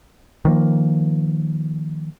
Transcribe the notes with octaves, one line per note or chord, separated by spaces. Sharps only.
D#3 F3 A#3